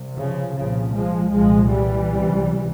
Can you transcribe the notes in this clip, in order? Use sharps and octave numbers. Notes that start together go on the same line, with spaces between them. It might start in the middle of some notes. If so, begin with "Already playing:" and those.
Already playing: C2 C3
C#3 F3
C2 A#2 C#3 F3
F3 G#3
C2 A#2 F3 G#3
E3 G3
C#2 C3